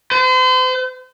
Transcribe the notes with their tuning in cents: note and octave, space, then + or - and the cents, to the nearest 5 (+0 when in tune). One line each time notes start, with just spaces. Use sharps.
C5 -40